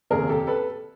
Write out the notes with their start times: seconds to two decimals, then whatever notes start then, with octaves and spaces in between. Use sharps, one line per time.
0.10 F1 D#2 C#3 G#4 A#4
0.29 G4 A4
0.47 A4 B4